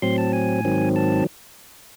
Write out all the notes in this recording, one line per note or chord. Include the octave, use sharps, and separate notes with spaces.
A2 F#3 C4 C6
A5
G#5
G#2 D#3 F#3 C4
A5